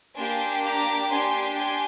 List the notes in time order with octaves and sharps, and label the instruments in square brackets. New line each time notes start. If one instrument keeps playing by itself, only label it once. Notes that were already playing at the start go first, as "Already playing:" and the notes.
[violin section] A#3 D4 G4 G#5 C6
A#5 D6
D4 G4 G#5 C6
G#5 C6